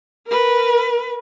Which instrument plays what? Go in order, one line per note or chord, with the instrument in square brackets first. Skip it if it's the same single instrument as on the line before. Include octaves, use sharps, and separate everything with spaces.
[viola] A#4 B4